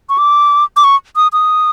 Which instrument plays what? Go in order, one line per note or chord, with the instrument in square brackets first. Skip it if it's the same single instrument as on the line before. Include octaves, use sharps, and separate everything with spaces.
[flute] C#6
D6
D6
C#6
D#6
D#6